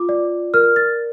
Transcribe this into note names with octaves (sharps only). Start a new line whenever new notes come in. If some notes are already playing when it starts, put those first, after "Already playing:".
Already playing: F4 D6
D5
A#4 F6
A6